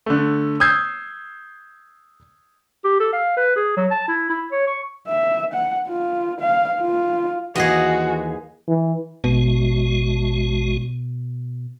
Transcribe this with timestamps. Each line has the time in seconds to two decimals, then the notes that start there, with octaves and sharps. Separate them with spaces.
0.06 D3 A3
0.60 D#6 E6 G6 G#6 C7
2.85 G4
3.00 A4
3.13 F5
3.37 B4
3.56 G#4
3.77 F#3
3.91 A5
4.08 E4
4.30 E4
4.52 C#5
4.67 C#6
5.08 E5
5.53 F#5
5.88 F4
6.40 F5
6.81 F4
7.55 D#2 E3 F#4 G#4 D#5
8.68 E3
9.24 A1 B2 G#3 F#4